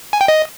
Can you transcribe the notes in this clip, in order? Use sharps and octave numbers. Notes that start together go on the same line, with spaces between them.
G#5
G5
D#5